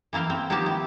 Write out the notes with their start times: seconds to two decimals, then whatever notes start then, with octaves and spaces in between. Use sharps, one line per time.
0.13 E3 A#3 E4 F5 G5
0.30 C4
0.50 D#3 F3 A#3 B3 G4 A5
0.66 E4